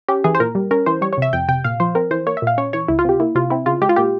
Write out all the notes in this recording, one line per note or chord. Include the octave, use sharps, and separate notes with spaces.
C#4 G4
E3 G#4
C5
A#2 A#4
G3
C#4 A#4
E3 C5
G3 C#5
C#5
C3 E5
F2 G5
C3 G5
A#2 F5
F3 C5
C4 A#4
E3 C5
A#3 C#5
E5
A#2 F5
C#4 C#5
E3 C#5
C#2 E4
F4
C3 G4
A#3 E4
C3 F4
C4 E4
C#3 F4
G#3 G4
F4
A#2 G4